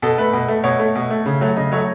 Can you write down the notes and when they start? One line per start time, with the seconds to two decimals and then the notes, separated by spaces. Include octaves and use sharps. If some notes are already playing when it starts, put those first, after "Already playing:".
0.02 B2 A4
0.18 A3 B4
0.33 B2
0.48 A3
0.64 B2 C#5
0.79 A3
0.95 B2
1.10 A3
1.26 C#3
1.41 F#3 A3
1.57 C#3 D#5
1.72 F#3 A3 C#5